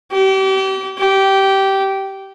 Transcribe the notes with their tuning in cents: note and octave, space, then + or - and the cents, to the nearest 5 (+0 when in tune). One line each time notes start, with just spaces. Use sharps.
G4 -35
G4 -15